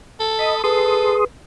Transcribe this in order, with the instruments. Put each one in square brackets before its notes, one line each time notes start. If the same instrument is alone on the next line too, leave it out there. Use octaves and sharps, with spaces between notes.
[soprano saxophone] A4
[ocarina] D#5 [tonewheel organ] B5 D#6
[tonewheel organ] G#4 C6 D#6 [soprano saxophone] A4 [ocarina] B4